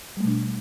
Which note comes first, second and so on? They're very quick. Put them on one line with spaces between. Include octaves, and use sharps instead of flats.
G3 A3 B2 D4